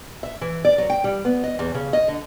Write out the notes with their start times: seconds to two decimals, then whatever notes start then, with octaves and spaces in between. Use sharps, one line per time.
0.23 E5
0.41 E3
0.65 D5
0.78 F#3
0.90 G5
1.04 G3
1.25 B3
1.44 D#5
1.59 E2
1.74 C#3
1.93 D#5
2.08 D3